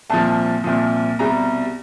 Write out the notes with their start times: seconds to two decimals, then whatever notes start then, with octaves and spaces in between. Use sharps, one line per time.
0.10 C2 A#2 F3 A5
0.64 C2 A#2 F3
1.19 C2 B2 G3 A#5